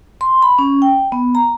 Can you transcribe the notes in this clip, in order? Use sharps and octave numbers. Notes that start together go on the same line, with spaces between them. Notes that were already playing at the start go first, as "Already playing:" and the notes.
C6
B5
C#4
G5
B3
A#5